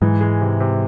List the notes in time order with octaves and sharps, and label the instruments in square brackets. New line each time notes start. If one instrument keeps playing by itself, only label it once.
[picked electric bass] G#2 [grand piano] E3
[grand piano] G#3
C3
C3